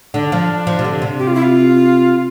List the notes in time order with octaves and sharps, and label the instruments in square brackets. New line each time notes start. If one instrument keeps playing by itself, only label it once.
[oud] D3 [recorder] D4
[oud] F3
F3
C3
D3
C3
[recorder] G4
F4
E4
F4